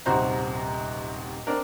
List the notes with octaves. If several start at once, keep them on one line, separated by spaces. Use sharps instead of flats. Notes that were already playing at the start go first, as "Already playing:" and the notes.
D#1 G#2 C3 F#4 C5 A#5
C4 D4 A#4